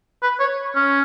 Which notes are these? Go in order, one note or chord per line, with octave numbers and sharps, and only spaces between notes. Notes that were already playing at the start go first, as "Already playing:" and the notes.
B4
C#5
C#4